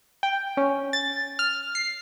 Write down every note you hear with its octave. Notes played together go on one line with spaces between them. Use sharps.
G5
C#4
A6
F6
C7